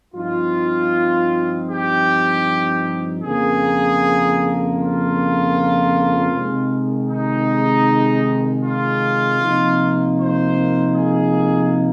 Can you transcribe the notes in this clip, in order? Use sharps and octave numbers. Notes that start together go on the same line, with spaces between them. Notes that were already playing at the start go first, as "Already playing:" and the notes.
G2 F3 C4 D#4 F4
G4
F2 C#3 F3 A#3 G#4
F4
C3 D#3 G#3
D#4
F4
C3 F3 A#3 D#4
C5
G#4